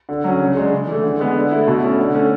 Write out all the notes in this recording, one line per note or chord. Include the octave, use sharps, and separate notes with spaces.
D3
F#3 C#4
C#3
G#3 D4
C#3
E3 A3
D3
G#3 B3
D3
A3 E4
B2
A3 C#4 E4
D3
A3 C#4